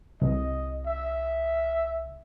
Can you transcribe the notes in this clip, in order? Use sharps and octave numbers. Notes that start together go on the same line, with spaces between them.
C2 D#5
E5